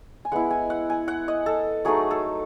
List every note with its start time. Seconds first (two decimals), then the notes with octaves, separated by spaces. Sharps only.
0.25 G#5
0.32 G#3 B3 E4 F#5
0.51 G#5
0.70 F#5
0.90 G#5
1.08 F#5
1.28 D#5
1.46 A4
1.85 F#3 A3 D#4 G#4
2.11 A4